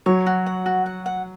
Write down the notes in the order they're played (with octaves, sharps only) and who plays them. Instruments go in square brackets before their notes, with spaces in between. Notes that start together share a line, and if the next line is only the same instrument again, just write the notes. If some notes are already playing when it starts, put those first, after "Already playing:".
[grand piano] F#3 [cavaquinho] C#5
[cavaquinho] F#4
F#5
F#4
F#5
F#5